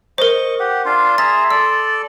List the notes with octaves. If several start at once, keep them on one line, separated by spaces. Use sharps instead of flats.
A#4 C5 D#5 C#6
G4 F#5
D4 F4 F5 C6
G#4 E5 A#5 A6
A4 D5 E6